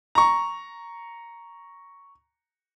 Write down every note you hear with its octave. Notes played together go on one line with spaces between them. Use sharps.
A#5 C#6